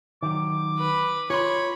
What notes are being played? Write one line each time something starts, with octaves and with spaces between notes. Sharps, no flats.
D#3 F#3 D6
B4 B5
F4 C#5 B5 C6